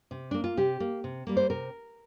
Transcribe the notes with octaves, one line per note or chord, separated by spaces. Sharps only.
C3
A#3 D4
F4
C3 G4
A#3
C3
G3 A#3
C5
C3 A#4